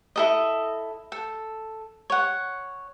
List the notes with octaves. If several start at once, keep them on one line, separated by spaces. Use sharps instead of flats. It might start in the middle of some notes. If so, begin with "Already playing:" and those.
E4 A4 D#5
A4
C#5 F#5